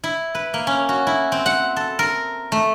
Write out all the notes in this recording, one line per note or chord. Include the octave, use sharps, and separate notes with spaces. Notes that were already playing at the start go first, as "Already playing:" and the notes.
E4
B4
A#3
C#4
F#4
E4
C4
F#5
A4
A#4
A3